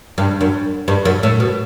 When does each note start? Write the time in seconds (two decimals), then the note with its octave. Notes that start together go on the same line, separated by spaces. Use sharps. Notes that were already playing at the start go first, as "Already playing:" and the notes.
0.18 G2
0.41 F#2
0.88 G2
1.05 F#2
1.23 A2
1.40 B2